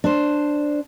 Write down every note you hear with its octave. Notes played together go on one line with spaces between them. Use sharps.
D4 C5